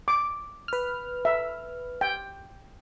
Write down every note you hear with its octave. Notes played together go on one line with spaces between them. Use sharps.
D6
B4 F6
E5
G5